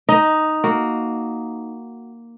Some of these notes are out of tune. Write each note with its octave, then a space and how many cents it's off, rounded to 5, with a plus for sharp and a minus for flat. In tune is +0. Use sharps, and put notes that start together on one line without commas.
D#4 +0 D#5 +15
A#3 +0 F#4 -5